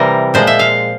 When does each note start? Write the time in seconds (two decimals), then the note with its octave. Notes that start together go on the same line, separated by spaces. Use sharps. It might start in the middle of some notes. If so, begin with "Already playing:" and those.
Already playing: C3 E3 G3 A#4
0.34 A#2 F3 G#3 C5
0.47 E5
0.59 F5